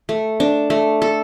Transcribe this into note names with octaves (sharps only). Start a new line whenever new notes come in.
A3
D4
A3
A4